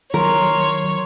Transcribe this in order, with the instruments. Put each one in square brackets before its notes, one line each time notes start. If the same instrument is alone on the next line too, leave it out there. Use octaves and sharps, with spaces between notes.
[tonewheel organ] D#3 F#3 [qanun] A#4 [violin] C#5 [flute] C6